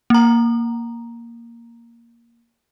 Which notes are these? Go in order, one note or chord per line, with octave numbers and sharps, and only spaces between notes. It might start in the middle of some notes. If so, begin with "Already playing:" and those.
A#3 A#5